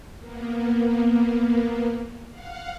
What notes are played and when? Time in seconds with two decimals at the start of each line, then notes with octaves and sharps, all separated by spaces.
0.19 A#3 B3
2.30 F5 F#5